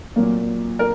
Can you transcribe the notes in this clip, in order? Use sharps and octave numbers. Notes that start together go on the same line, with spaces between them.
A#2 F#3 A#3
A#4